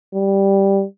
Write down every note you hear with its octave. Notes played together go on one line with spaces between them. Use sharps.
G3